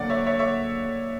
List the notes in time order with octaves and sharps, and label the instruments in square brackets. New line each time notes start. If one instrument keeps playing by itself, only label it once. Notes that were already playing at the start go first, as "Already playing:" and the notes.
Already playing: [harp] D2 D3 F#3 A#3 [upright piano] D5 F#5
[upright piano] C#5 E5
C#5 E5
C#5 E5